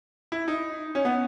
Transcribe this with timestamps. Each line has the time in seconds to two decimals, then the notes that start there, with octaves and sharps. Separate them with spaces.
0.32 E4
0.48 D#4
0.95 C#4
1.05 B3